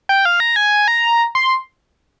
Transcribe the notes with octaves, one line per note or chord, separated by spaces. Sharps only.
G5
F5
A#5
G#5
A#5
C6